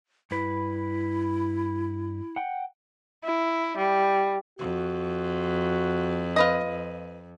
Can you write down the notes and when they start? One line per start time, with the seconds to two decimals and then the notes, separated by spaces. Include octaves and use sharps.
0.31 G2 E4 B4
2.36 F#5 G5
3.24 E4
3.77 G3
4.59 F2 F#4
6.36 F4 B4 D#5